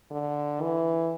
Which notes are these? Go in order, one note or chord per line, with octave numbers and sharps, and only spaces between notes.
D3
E3